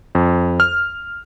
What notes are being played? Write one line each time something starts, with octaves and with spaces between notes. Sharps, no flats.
F2
F6